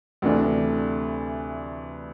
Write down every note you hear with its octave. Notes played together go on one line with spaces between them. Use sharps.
D2 C3 E3 A3 D4